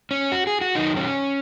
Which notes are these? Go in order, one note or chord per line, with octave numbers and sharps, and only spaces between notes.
C#4
F#4
G#4
F#4
F#2 D#3 F#3 D#4
C#4